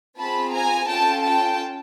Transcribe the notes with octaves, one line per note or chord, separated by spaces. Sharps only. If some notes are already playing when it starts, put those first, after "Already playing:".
C4 F4 G#4 A5 B5
G#5 A#5
C#4 F4 A4 G5 A5
G5 A5